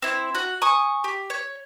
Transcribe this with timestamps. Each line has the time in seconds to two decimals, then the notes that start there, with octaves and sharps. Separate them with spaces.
0.02 C4 E4
0.35 F#4
0.62 G#5 C#6 D#6
1.04 G4
1.30 C#5